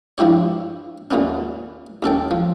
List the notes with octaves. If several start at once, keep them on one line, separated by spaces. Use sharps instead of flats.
G2 F3 E4 G4 C#5
D#2 A#2 A3 B3 C#4
D#2 C#4 A4 G5
F3